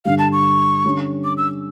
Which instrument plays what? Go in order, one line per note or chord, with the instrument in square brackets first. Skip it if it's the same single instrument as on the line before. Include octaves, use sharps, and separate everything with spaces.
[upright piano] G2 D3 G3 [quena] F5
[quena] A5
C#6
[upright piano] D3 G3 C#4
[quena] D6
E6